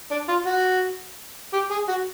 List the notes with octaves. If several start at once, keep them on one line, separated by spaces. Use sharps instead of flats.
D4
F4
F#4
G4
G#4
F#4